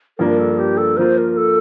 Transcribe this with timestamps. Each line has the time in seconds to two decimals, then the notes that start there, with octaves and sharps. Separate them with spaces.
0.18 G2 F3 A#3 D4 A#4
0.39 A4
0.58 G4
0.78 A4
0.97 F3 A#3 F4 C5
1.18 A#4
1.37 A4